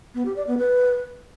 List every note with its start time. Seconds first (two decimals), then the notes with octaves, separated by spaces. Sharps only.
0.15 B3
0.25 G4
0.36 D5
0.47 B3
0.58 B4